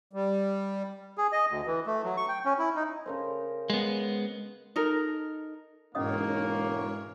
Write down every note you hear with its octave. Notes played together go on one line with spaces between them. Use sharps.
G3
G#4
D#5
D2
E3
A3
F#3
C#6
G5
C#4
E4
D#4
C#3 A#4 C5
G#3 B3
D#4 A4 A#4
E1 G#2 A#3 C#4 C#5 D#5 D#6